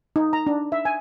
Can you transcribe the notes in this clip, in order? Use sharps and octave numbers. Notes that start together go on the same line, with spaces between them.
D#4
A#5
D4
E5
G#5